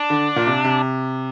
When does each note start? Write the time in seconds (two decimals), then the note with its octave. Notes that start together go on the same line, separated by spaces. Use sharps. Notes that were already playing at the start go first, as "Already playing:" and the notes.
Already playing: D4
0.10 D3
0.36 A#2
0.47 C3
0.64 C3